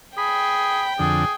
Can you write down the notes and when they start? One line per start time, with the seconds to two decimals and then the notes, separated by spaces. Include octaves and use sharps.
0.18 G#4 G5 B5
0.99 F2 D3 G#4